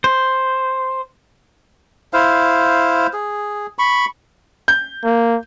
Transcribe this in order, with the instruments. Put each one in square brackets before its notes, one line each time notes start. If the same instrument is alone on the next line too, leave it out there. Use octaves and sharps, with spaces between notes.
[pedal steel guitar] C5
[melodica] E4 C5 F5
G#4
B5 C#6
[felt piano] G6
[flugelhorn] A#3